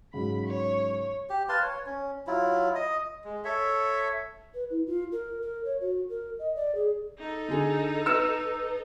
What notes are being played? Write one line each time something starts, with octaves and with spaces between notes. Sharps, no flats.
G#2 C#3 F#3 B5
C#5
G4
B4 F5 A5 C6
C#5
C#4
F#3 E4 F4
D#5 D#6
G#3
A4 C#5 E5
B4
E4
F4
A#4
A#4
C#5
F#4
A#4
D#5
D5
G#4
D#4 A4
D3 G#4
B4 E6 C#7 E7